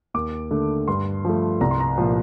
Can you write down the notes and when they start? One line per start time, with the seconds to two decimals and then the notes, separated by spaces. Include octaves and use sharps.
0.14 D#2 D6
0.51 D3 A3
0.88 G2 C6
1.25 F3 A3
1.61 C2 A#5
1.71 C6
1.80 A#5
1.98 A#2 F3